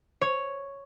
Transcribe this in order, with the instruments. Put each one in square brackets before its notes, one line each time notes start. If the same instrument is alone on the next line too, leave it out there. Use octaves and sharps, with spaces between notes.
[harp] C#5